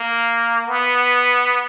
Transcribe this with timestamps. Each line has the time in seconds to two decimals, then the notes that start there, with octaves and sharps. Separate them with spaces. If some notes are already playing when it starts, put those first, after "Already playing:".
Already playing: A#3
0.68 B3